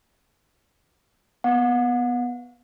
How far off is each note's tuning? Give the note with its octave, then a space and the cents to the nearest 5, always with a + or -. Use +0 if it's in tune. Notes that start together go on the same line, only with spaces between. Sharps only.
B3 +0 F#5 -35